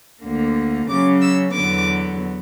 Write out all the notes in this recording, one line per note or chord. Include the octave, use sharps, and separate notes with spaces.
D2 D3 A#3
C#3 F#3 C#4 D6
E6
E2 D3 F#3 B3 D6